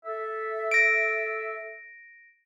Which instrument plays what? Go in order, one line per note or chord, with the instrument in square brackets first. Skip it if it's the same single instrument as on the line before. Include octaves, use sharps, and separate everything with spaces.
[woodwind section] A4 E5
[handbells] A#6 D7